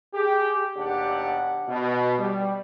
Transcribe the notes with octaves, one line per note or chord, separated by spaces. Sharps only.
G4 G#4
D#2 B2 D4 G4 D5 F#5
B2
G3